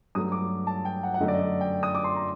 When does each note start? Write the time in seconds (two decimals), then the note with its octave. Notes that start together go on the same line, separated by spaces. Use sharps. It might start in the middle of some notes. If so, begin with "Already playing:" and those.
0.15 G2 F#3 A3 D#6
0.32 D6
0.67 A5
0.85 G5
1.03 F#5
1.14 F#5
1.20 F#2 D3 A3 D#5
1.28 D5
1.33 D#5
1.61 G5
1.83 D#6
1.95 D6
2.04 C6
2.15 A#5